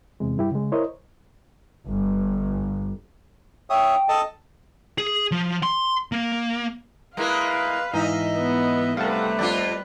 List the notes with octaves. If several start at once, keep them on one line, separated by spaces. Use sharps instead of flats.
E2 C3 G#3
G2 E4 G4
C#3 G#3
E4 A#4 C5 C#5 D#5
G1
C#5 E5 G5 D#6
A4 D#5 A5
G#4
F3
C6
A#3
G#3 A#3 E4 B4 F5
G#2 E3 D#4 D#5 E5
B3
C3 G3 A3 B4 F5 F#5 A5
F2 D4 F4 D5